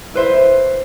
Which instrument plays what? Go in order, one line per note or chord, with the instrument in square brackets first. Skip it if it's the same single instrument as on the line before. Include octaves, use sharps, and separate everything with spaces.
[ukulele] E4 B4 C5 E5